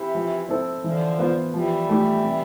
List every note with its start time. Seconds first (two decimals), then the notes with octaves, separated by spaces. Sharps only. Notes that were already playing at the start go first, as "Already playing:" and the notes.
Already playing: C3 E3
0.15 F3
0.49 C4 E4 A4 C5
0.83 D3 E3 F3
1.19 B3 F4 C5
1.53 E3 F3 G3
1.89 A3 E4 G4
2.24 C3